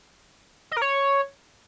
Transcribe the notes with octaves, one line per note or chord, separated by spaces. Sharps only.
D#5
A#4
C#5